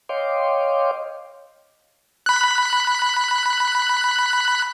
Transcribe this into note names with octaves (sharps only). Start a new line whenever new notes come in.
C#5 D#5 F5 G5 C6 D6
B5 F#6